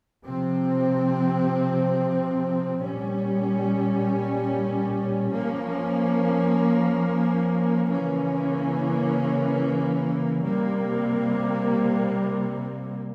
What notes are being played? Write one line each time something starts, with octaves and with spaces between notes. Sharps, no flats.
C3 F3 C4
A#2 G3 C#4
F3 A#3 C#4
C#3 E3 A#3 C#4
C3 G3 A#3